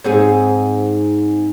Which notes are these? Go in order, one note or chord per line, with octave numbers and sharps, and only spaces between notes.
G#2 C4 G#4